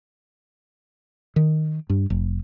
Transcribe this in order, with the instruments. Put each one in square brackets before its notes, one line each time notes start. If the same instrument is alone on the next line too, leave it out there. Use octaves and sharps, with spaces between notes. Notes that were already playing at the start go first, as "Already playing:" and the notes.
[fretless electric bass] D#3
G2
F1